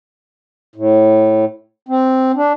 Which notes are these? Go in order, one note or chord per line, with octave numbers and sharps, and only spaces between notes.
A2
C4
D4